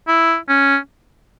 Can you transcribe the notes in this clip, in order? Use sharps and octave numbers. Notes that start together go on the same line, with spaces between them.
E4
C#4